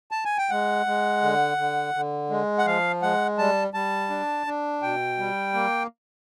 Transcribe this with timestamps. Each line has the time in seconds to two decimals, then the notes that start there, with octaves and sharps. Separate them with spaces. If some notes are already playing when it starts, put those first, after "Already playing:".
0.11 A5
0.25 G#5
0.38 G5
0.50 G#3 F#5
0.86 G#3
1.22 D3
1.58 D3
1.94 D3
2.30 G#3
2.58 F#5
2.66 F3 F5
3.02 G#3 F#5
3.38 G3 A5
3.74 G3 A5
4.10 D4
4.47 D4
4.82 B2 G5
5.18 G3
5.54 A#3